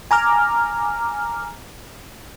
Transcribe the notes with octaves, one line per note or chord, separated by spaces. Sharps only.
G#5 A#5 D6 F6